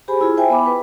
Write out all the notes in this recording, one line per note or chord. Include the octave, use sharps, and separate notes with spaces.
G4 G#4 C5 G#5 B5
E4 F4 G#4
C5 E5 G5 G#5
B3 B5 D6
B4